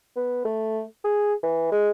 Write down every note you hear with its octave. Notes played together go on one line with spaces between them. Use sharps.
B3
A3
G#4
E3
G#3